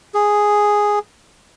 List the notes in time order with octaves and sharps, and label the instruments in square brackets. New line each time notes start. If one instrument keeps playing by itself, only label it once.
[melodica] G#4